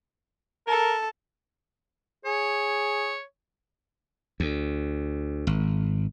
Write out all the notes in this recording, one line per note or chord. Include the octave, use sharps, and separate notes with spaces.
A4 A#4
G#4 C#5
D2
G#1